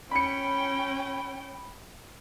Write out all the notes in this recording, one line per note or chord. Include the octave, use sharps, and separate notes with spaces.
C#4 G5 B5 C#7